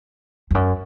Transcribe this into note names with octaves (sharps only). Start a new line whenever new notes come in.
F2
F#2